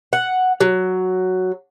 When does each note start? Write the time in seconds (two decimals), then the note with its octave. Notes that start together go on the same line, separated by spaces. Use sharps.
0.13 F#5
0.61 F#3